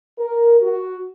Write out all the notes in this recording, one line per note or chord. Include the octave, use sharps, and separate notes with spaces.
A#4
F#4